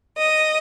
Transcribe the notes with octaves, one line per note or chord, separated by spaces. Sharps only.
D#5